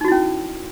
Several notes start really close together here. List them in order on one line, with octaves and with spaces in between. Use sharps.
D#4 F#4 E4 C#4